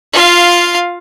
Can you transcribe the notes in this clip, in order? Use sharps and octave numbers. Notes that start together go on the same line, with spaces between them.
F4 F5